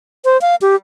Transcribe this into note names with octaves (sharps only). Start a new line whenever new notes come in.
C5
F5
G4